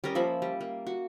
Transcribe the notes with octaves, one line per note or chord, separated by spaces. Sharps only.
G3 C#4 A#4 D#5
F3 A#3 E5 B5
G3
A#3
F#4